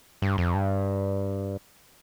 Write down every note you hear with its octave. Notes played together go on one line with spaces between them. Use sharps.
G2
F2
G2